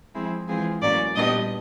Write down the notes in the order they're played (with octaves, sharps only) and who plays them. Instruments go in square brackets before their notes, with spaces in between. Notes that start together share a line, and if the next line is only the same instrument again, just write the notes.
[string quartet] F3 G#3 C4 E4 G#4
E3 G#3 C4 F4 G#4
[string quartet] A2 F#3 A#3 C#4 [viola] D5
[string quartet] A#2 G3 B3 D4 G4 [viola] D#5